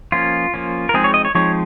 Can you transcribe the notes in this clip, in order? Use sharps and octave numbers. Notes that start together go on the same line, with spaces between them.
F3 A#3 C#4 F4
F3 A#3 C#4
A#4
F3 G#3 C4 D#4 G#4
C#5
D#5
C#5
F3 G#3 C4 D#4 C#5